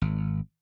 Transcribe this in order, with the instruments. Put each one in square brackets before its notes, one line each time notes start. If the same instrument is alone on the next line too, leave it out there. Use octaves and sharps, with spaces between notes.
[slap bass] G#1